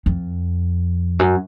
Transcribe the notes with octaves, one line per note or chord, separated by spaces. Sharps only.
F2
F#2